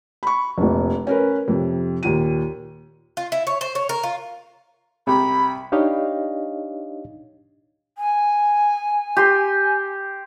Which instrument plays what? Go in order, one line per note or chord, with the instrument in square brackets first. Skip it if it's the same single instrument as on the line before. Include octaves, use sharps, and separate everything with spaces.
[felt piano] B5 C#6
F1 A#1
C#4 A#4 B4
F2 C3
D#2 A#2 D#7
[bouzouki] F4
E4
C#5
C5
C#5
A#4
F4
[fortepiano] C2 G4 A#5 [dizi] B5
[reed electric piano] D4 D#4 G4 C#5 D#5 F5
[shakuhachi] G#5
[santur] G4 C6